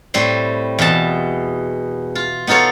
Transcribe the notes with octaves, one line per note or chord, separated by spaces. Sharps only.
A2 G3 C4 C6
E2 B2 A5
F4
B3 D#4 F4 A4 C#5